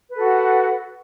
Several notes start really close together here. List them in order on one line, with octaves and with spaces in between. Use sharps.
B4 A4 F#4 F#5